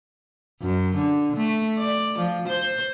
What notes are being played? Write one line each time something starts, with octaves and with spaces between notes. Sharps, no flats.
F#2
D3
A3
D5
F3
C5